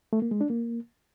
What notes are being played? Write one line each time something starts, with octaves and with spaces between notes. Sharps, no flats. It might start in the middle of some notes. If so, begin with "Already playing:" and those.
A3
A#3
G#3
D4
A#3